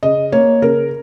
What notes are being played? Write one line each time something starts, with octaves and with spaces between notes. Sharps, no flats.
C#3 D#5
A#3 C#5
C#3 A#4